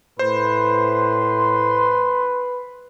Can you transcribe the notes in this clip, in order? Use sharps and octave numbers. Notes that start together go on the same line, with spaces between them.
A2 B4 C5 C6